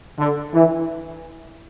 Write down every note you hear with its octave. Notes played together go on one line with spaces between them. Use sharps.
D3
E3